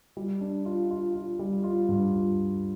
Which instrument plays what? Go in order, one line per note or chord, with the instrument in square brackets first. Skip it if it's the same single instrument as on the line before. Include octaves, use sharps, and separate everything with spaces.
[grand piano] G3
D4
F4
F4
F4
G3
F4
G2
F4